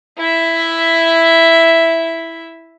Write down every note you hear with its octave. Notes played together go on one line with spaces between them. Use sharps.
E4 E5